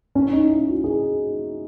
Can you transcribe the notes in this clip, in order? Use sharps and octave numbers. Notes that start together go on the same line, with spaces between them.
C#4
D#4
E4
F#4
G#4